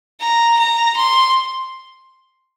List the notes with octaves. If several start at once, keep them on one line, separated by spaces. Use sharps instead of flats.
A#5
A#5
C6